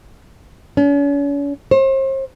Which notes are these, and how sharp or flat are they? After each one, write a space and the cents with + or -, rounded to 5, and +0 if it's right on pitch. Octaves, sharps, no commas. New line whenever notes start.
C#4 +40
C5 +40